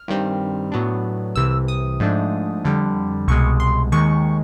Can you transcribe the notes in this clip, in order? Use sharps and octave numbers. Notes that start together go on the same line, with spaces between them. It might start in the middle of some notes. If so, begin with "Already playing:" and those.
Already playing: F6
G2 D#3 G3 C4
A2 F#3 B3 D4
C2 C3 E3 E6
D#6
G#2 F3 A3 D4
F2 D3 G3
C2 B2 G#3 C#6
C6
D#2 D#3 G#3 C#6